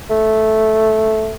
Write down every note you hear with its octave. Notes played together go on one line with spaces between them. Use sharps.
A3